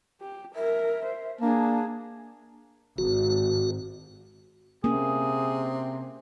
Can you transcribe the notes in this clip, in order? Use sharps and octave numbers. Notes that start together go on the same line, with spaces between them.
G4
A#4 E5
C5
A#3 D4 G#4 A5
G#1 F#4
C3 A#3 C#4 G#4